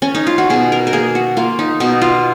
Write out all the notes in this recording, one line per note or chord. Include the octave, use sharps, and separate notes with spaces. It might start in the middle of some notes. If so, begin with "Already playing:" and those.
C#4
D#4
F4
F#4
B2 G#4
A#4
A#4
A#3 G#4
F#4
A#3 F4
D#4
B2 D#4
F4